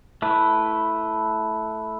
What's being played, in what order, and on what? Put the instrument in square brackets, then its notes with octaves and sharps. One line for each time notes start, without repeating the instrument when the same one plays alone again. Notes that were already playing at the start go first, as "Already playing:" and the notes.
[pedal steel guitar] A3 E4 B4